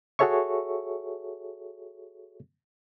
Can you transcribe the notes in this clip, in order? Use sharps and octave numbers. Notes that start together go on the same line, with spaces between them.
F#4 G#4 A4 C#5 E5 C#6